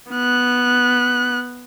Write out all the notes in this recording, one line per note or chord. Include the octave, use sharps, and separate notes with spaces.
B3 F#6